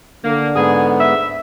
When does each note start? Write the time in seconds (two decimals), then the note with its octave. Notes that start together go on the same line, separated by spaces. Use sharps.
0.24 D3 A#3
0.56 G#2 B3 G#4
0.99 E5